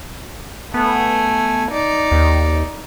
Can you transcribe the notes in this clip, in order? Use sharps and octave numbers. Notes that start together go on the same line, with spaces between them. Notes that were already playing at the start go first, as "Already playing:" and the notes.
A3 B3 G#5
D#4 D5
D#2